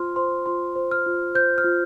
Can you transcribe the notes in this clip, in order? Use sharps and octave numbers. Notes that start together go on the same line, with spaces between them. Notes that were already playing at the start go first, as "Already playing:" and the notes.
Already playing: F4 C5 C6 F6
C5 C6
F4 C6
C5
F6
F4
C5 G6
F6
F4